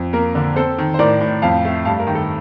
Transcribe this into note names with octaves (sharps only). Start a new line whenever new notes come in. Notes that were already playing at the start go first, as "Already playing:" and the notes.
Already playing: F2
A#3 A#4
D3
C4 A4 C5
D#3
C5
A2 A#4 D5
A2
F2 F5 A5
A3
G2 F5 A5
A#4
D#3
A4